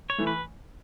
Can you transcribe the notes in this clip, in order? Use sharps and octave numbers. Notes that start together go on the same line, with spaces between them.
C#5
E3 A3
B4